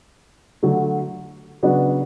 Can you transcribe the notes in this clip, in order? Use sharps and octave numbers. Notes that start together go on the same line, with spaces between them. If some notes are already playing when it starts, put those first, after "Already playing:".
D3 F#3 A3
C#3 F#3 B3 D4 F#4